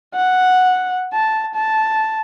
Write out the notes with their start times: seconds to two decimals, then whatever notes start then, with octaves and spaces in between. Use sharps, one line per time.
0.15 F#5
1.13 A5
1.55 A5